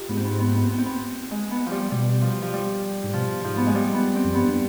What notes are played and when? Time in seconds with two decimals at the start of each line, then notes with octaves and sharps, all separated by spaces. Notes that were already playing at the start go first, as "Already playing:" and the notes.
Already playing: D#4 F4 G4
0.09 G#2 B3
0.17 C4
0.25 B3
0.32 C4
0.40 B3
0.47 C4
0.55 B3
0.63 C4
0.71 B3
0.78 C4
0.86 B3
1.31 G#3
1.51 B3
1.66 F3 G3
1.91 B2 G3
2.22 F3
2.42 F3
2.53 G3
3.04 G#2
3.13 B2 F3
3.44 G#2 F3
3.57 B3
3.66 G#3
3.75 G3
3.94 B3
4.16 C4
4.24 F2
4.35 G2 B3